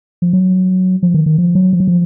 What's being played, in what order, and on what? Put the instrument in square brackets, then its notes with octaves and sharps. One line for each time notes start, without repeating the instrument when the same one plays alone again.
[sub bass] F3
F#3
F3
D#3
D#3
F3
F#3
F3
F#3
F3